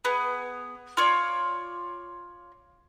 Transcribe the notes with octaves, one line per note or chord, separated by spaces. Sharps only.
B3 G#4
F4 C#5 D5